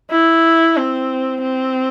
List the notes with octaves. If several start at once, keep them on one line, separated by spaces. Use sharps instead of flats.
E4
C4
C4